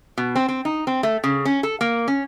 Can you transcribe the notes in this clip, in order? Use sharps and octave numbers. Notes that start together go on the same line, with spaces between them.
B2
C4
C4
D#4
C4
A3
C#3
C#4
A4
A#3
C#4